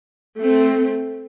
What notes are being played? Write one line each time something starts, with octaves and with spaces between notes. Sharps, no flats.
A3 C4